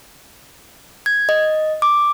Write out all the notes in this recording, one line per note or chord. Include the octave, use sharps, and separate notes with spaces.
G#6
D#5
D6